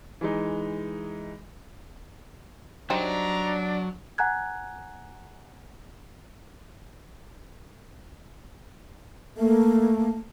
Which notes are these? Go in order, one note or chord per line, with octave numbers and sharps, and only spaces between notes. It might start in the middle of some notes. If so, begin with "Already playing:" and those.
E3 G#3 D#4
F#3 G3 D4 D#4 C5 A#5
F#5 G#5 A#5 F#6 G#6
A3 A#3